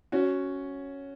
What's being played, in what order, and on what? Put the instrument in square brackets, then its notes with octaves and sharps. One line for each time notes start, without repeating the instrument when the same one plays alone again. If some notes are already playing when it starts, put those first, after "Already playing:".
[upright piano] C#4 F#4